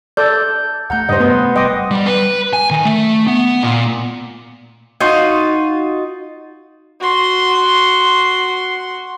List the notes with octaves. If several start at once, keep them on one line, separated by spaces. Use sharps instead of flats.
A4 D5 G6
D#2 A3 F#5 A#5 G6
G2 C#3 C5 D#5
C3 A3 B3 B4 F#5 C6
F#1 G3 D#5 G5 C6 D6
G3
B4
G#5
D#3
A3
B3
A#2
D#4 F4 F#4 D#5
F#4 C6